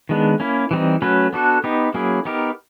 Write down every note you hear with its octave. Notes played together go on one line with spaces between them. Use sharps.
D#3 G#3 B3 D4
A#3 C#4 E4
E3 G3 C4 D#4
F#3 A3 C#4 F#4 B4
B3 D4 F#4 A4
B3 D#4 G4
F#3 A#3 C#4 E4 G#4
B3 D#4 G4 A#4